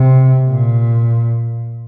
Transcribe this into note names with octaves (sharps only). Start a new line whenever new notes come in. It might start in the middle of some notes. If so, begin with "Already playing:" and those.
Already playing: C3
A#2